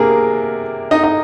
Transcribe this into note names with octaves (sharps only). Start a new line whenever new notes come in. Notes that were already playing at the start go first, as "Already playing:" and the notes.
Already playing: C3 A#3 D4 G#4 A#4
D#4 D#5
D#4 D#5